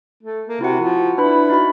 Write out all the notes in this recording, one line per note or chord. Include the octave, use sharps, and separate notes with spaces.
A3
A#3
C3 E4 F#4 F#5
F3
D4 E4 B4 B5
D#4 F#4 B5